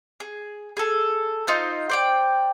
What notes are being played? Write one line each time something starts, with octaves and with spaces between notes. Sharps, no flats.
G#4
G#4 A4
D#4 F4 C5
C5 D5 G5